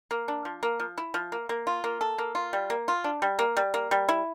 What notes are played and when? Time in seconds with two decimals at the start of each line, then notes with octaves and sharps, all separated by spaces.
0.11 A#3
0.28 D4
0.45 F3
0.63 A#3
0.80 F3
0.98 E4
1.14 F3
1.32 A#3
1.49 A#3
1.67 F4
1.84 A#3
2.01 A4
2.18 A#3
2.35 F4
2.53 G3
2.70 A#3
2.88 F4
3.04 D4
3.22 G3
3.39 A#3
3.57 G3
3.74 A#3
3.91 G3
4.09 E4